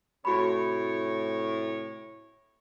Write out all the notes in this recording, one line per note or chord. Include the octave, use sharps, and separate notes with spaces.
A2 C3 F#4 C#5 B5